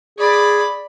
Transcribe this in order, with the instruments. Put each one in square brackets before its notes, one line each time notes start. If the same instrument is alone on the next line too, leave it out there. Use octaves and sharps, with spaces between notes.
[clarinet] G#4 [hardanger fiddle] D5 B5